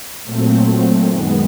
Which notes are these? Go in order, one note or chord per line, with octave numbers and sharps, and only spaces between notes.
A#2 F#3 A3 C4
F#2 D#3 G#3 B3